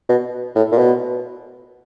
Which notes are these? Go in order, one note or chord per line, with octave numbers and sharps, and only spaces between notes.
B2
A2
A#2
B2